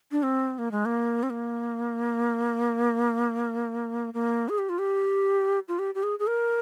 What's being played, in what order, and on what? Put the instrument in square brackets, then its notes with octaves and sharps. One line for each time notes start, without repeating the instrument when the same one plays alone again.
[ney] D4
C4
A#3
G#3
A#3
C4
A#3
A#3
G#4
G4
F4
G4
F4
G4
G4
G#4
G#4
A#4